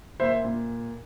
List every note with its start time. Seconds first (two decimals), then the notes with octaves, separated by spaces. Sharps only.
0.20 A#2 C5 E5
0.45 A#2